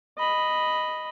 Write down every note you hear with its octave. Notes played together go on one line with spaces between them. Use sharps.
D#5 B5